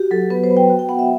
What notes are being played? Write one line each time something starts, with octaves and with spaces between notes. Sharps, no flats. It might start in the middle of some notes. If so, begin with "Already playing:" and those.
Already playing: F#4 G4
F#3 A4
B3 B4
C5
B3
G5
F#4
G5
B3 F#5
E5